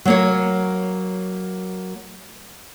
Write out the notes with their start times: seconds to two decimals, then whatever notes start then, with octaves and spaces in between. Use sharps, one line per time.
0.05 F#3 A#3 C#5